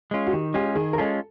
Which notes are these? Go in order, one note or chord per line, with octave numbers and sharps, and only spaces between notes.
G#3 C#4 F4
F#4
D#3 G4
G#3 C#4 F4 G4
D#3 G#4
A#4
G#3 C#4 F4 A4